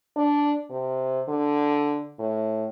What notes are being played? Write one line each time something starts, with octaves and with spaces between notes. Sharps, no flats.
D4
C3
D3
A2